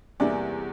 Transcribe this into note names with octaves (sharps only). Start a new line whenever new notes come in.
E2 C3 E3 G3 A#3 D5